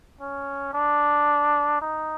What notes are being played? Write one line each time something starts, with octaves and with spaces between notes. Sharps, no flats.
C#4
D4
D#4